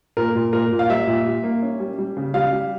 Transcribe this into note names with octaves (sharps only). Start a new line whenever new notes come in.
A#2 A#4
A#2
A#2 A#4
A#2
F5
G3 E5
A#2
G3
A#3
C#4
G3
G3
C#3
G3 F5
G3